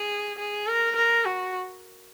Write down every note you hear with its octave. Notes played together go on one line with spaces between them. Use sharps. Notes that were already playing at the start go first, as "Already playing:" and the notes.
Already playing: G#4
G#4
A#4
A#4
F#4